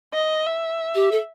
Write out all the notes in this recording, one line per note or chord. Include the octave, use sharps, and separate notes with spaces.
D#5
E5
G4
A4